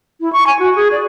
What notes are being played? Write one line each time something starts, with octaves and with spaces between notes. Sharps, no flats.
E4
C#6
G#5
F#4
G#4
D5